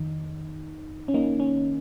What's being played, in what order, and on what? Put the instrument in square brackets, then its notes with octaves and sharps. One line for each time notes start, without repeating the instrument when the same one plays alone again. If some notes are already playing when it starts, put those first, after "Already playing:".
Already playing: [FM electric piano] F2 D#3 D#4
C#4
A#3 D#4
C#4